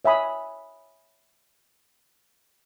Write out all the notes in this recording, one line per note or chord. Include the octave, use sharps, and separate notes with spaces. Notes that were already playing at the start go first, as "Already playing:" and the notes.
C#5 E5 G#5 B5 D#6